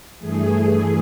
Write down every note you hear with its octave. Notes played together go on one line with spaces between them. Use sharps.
G2 E3 A3 G#4